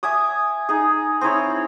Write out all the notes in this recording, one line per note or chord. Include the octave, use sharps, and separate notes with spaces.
E5 G#5 D6 D#6
D#4 G#4
C4 D#4 E4 C#5